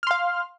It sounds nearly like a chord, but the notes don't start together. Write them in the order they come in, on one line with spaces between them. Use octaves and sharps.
F6 C6 F5